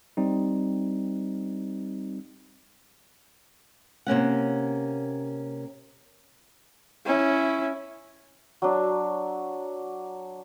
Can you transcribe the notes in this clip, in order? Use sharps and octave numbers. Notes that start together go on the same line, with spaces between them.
G3 C4 D#4
C3 A#3 C#4 F#5
C#4 E4
F#3 D4